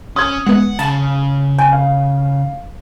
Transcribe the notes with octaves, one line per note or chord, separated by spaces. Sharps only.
C#4 D#6 G#6
G#3 B3 F#5
C#3 A5
G5 G#5
F5